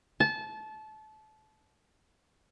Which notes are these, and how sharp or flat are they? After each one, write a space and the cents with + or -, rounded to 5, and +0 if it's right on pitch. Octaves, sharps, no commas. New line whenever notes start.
A5 -25